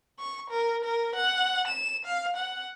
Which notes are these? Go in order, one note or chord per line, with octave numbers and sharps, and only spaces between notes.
C#6
A#4
A#4
F#5
E7
F5
F#5